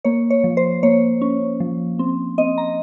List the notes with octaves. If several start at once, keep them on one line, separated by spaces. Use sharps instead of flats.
A#3 C#5
C#5
F3
C5
A#3 C#5
C#4
F3
C4
C4 D#5
A#5